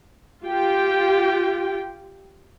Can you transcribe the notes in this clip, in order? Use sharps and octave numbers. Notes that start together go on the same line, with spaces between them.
F4 G4 G5